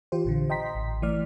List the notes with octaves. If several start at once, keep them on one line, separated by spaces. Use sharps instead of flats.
E3 F4 G4 C5
A#1 A#2 D3
D#5 G5 A#5 C6 B6
A1
E3 A3 D5 F6